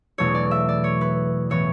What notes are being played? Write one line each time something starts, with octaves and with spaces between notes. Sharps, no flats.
E2 B2 F#3 A3 C#5
D5
E5
D5
C#5
B4
A2 E3 B3 C#5